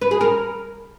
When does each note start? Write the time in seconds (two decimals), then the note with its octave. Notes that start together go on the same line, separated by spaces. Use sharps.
0.02 B4
0.11 G#4
0.21 A#4